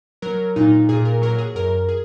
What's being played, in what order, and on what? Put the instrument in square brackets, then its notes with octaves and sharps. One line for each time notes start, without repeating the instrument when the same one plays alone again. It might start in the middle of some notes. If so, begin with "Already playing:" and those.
[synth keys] F#3 A#4
A#2 D#4
A#2 G#4
A#4
F#3 A#4
G#4
F#2 A#4
G#4